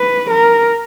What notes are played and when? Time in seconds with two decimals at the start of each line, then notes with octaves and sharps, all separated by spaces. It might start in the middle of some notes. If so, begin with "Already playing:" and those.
Already playing: B4
0.31 A#4